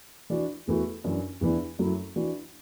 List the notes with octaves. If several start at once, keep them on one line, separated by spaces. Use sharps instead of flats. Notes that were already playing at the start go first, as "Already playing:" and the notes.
E3 D4 F#4
E2 E3 A3 F#4
F#2 E3 D4 F#4
E2 E3 D4
F#2 F#3 A3 E4
E3 D4 F#4